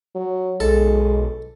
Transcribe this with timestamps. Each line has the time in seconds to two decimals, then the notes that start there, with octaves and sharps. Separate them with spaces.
0.15 F#3
0.60 B1 G#3 A4